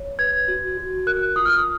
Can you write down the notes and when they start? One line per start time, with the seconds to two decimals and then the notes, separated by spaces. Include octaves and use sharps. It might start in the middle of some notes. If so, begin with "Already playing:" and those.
Already playing: C#5
0.19 B4 G#6
0.48 F#4
0.77 F#4
1.07 A#4 F#6
1.36 F4 D#6
1.45 F6
1.55 D#6